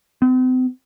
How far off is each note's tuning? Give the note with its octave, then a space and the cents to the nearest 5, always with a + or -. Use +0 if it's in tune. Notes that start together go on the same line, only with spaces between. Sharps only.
C4 -45